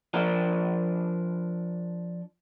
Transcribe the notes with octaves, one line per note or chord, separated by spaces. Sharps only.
F3 D4 A#4